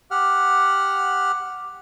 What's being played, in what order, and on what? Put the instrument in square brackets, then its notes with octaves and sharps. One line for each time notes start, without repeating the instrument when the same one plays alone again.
[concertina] G4 F#5 F6